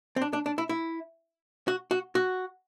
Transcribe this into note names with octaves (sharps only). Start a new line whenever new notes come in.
C4
D4
D4
D4
E4
E4
F#4
F#4
F#4